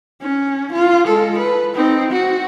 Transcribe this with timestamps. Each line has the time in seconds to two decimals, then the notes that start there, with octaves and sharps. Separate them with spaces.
0.21 C#4
0.73 F4
1.07 G#3 A4
1.38 B4
1.75 C4 D#4
2.11 F#4